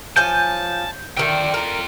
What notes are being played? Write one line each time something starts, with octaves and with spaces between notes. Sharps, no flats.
F3 C#5 G#5 A5 G6
D3 D#3 F4 G5
A#4